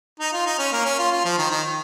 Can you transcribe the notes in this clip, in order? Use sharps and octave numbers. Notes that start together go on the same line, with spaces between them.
D#4
F4
D#4
C#4
A#3
C#4
F4
F4
F3
D#3
D#3